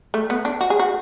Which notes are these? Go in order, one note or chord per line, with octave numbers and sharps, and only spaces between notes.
A3
B3
D4
F#4
G#4
F#4